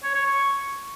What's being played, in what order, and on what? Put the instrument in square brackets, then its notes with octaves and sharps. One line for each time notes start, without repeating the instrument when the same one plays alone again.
[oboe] C#5
C#5
C#6